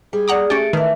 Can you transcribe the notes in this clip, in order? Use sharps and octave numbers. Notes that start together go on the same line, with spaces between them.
G3 G#4
D5 F#5 A#5 D6 D#6
A3 C#4 G4 A6 C#7 D7
D#3 E3 A3 B4